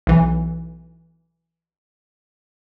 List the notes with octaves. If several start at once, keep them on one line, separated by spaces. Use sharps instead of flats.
B1 E3